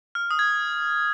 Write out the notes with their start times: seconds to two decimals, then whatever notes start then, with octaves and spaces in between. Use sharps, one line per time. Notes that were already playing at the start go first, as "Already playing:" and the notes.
0.15 F6
0.31 D#6
0.39 G#6